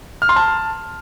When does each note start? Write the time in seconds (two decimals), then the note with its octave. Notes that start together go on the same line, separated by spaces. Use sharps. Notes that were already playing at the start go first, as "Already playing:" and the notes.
0.22 F6
0.29 C6
0.36 A5